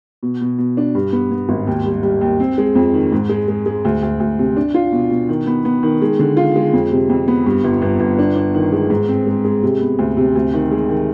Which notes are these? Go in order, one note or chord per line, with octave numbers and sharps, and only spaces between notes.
B2
B2
B2
D4
G2
B3
B3
G#1
D#2
G3
G3
D#2
C4
G#3
F2
D#3
G#2
G#3
G#3
G#3
D2
D2
D2
C3
D4
F4
B2
B2
D#3
B3
B3
D#3
G#3
D3
F4
G#3
F2
C3
F2
B3
G2
G1
G1
G1
D4
D4
D#3
G#3
G#2
C4
G#3
G#3
C3
B3
D2
C3
D2
D#3
G#3
D#3